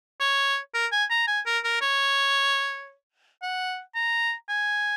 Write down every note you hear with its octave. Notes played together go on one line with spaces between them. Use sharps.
C#5
A#4
G#5
A#5
G#5
A#4
A#4
C#5
F#5
A#5
G#5